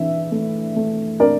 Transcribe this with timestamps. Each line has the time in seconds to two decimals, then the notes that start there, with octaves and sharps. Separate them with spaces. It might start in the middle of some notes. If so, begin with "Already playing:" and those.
Already playing: E3 D4 E5
0.31 A3
0.76 A3
1.20 D4 A#4 D5